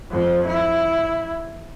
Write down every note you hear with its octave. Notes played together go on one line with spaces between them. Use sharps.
F2 F3
E4